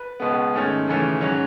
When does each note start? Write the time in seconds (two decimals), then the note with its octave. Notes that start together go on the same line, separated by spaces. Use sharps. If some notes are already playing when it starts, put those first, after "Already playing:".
Already playing: B4
0.20 C#2 B2 G#3 B3
0.54 G#2 D#3 A3 C#4
0.88 D#2 C#3 E3 A3 C#4
1.21 G#2 F#3 C#4 C#5